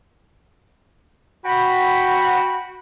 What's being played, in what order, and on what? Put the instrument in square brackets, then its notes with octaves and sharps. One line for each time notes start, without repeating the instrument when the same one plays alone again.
[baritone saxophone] F#4 [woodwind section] G5 B5